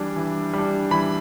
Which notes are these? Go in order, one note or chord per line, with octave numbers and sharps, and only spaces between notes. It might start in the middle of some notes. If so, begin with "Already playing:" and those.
Already playing: E3 G3 D4
E3
G3 D4
E3 B5